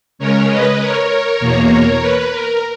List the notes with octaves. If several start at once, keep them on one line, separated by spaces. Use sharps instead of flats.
C#3 G#3 C#4 A#4 C#5
B4 D#5
A#4 C#5
E2 B2 A#3
B4
A#4